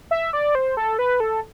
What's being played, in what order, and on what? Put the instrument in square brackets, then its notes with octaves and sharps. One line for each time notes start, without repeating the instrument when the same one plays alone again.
[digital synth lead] E5
D5
C5
A4
B4
A4